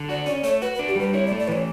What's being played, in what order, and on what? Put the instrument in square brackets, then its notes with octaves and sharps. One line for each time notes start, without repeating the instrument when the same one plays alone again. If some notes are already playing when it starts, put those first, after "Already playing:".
Already playing: [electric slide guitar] D3
[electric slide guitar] F#4 [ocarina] D5
[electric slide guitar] C#4 [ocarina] D5
[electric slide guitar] A3 [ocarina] C#5
[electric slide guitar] F#4 [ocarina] B4
[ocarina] B4
[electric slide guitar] D4
[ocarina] G4
[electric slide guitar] G3 [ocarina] B4
[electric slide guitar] E4 [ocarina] C#5
[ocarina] D5
[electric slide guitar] A3
[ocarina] D5
[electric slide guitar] E3 [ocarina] B4 C#5